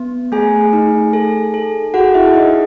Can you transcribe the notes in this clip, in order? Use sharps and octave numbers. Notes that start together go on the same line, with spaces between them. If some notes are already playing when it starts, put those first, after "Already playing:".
Already playing: B3
A3 G#4 G#5
D#4
A4
A4
F#4 G#4 F#5
E4 E5
D#4 G#4 D#5